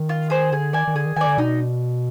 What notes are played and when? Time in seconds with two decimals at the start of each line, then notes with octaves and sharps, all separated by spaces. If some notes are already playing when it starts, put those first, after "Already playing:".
Already playing: D#3
0.09 F4
0.30 G#4 C5
0.52 D3 G#4
0.73 D#3 D5 G#5
0.87 D#3
0.95 D3 G#4
1.06 D#3
1.16 D#3 D5 G#5
1.27 D3
1.38 B2 D#4